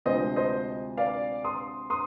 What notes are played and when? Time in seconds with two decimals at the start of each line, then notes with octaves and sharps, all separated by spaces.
0.05 D2 C3 F3 G#3 C5 D#5
0.36 C5 D#5
0.97 D5 F5
1.45 C6 D#6
1.90 C6 D#6